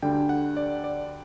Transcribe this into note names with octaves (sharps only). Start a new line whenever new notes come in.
D2 D3 G3 D4 G5
F#5
D5
D5